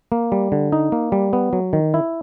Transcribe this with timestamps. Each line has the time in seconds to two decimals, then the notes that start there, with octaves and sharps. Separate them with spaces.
0.12 A#3
0.32 G3
0.52 D3
0.72 D#4
0.92 A#3
1.12 G3
1.33 B3
1.53 F#3
1.73 D#3
1.94 E4